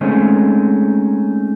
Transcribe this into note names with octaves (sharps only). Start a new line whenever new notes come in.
G#3 A3 C4 C#4 D#4